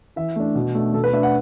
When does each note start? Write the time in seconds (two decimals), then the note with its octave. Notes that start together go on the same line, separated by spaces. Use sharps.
0.16 E3 E5
0.36 A3 D4
0.55 B2
0.75 A3 D4
0.94 B2 A4
1.04 B4
1.13 A3 D4 E5
1.23 F#5